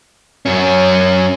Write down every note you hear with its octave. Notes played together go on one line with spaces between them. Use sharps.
F#2 C#4